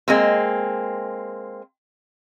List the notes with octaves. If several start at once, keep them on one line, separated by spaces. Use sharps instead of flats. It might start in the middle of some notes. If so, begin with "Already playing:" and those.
G#3 A#3 C4